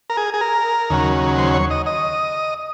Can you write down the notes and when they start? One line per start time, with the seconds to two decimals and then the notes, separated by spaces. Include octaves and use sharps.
0.10 A#4
0.17 G#4
0.34 G#4
0.41 A#4
0.90 D#2 C#3 F#3
1.38 C5
1.54 C#5
1.71 D#5
1.86 D#5